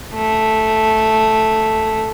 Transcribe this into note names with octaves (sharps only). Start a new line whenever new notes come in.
A3